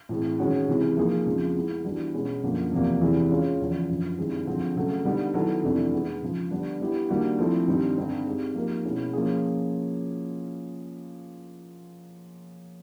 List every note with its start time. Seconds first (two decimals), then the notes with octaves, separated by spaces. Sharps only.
0.09 A2 E3 G#3 C4
0.39 D#3 G#3 C#4 F#4
0.68 C3 E3 G#3
0.97 F3 A#3 D#4 G#4
1.26 F2 C#3 F3 G#3
1.55 G#3 B3 E4
1.85 E3 G3 B3 D4 F#4
2.14 B2 G#3 C#4
2.43 F#2 D3 F3 A#3
2.72 E2 C3 F3 A#3
3.01 E2 C3 E3 G#3
3.30 G#3 C#4 F4
3.60 E2 C#3 F3
3.88 F#2 D3 F3
4.18 G2 D#3 G#3 C4 E4
4.47 D3 F3 G#3 C4
4.76 C#3 F#3 A3
5.05 D3 G3 B3 D#4
5.34 D#3 F#3 B3 E4 A4
5.63 F2 C3 E3 A3 D4
5.93 G#3 B3 D#4
6.22 C#3 F3 G#3
6.51 D3 G3 B3 D4
6.80 G3 B3 E4 G4
7.09 D#3 G3 A#3 D4 F#4
7.39 F3 A3 C4 E4 A4
7.68 G2 D#3 G3 C4 D#4
7.97 G2 D3 G3 C4 D#4
8.26 G#3 C4 D#4 G4
8.55 F3 A#3 D#4 G4 A#4
8.85 B2 G#3 C#4 E4 G#4
9.13 F3 A#3 C#4 F4 G#4